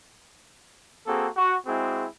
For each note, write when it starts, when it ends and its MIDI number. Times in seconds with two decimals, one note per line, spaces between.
1.07 1.29 58
1.07 1.29 60
1.07 1.29 66
1.07 1.29 68
1.07 1.29 69
1.36 1.55 66
1.67 2.06 56
1.67 2.06 60
1.67 2.06 64
1.67 2.06 66
1.67 2.06 68